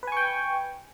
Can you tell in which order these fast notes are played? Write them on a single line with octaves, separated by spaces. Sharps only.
B4 G#5 C#6 G5